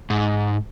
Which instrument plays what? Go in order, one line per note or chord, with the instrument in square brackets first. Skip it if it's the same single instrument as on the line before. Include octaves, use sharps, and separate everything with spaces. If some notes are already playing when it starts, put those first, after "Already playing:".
[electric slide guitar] G#2